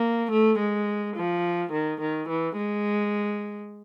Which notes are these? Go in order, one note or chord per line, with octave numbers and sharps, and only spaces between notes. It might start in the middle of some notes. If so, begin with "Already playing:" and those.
Already playing: A#3
A3
G#3
F3
D#3
D#3
E3
G#3